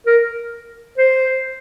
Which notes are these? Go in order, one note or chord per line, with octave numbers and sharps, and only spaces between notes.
A#4
C5